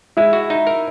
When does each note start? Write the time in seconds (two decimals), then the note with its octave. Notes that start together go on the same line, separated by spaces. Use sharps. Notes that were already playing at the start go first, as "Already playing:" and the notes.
0.17 G#3 E4 E5
0.33 F#4
0.50 D#4
0.67 A#4